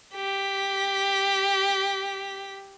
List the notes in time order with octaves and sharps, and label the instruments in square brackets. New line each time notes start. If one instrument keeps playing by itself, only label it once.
[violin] G4 B6